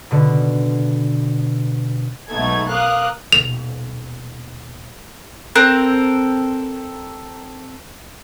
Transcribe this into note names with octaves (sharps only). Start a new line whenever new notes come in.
B2 D3
B1 G#3 A3 B3 D#4 G#6
A#4 F5 D6 D#6 F#6
D#1 B2 F7
C4 A4 A#4 F#6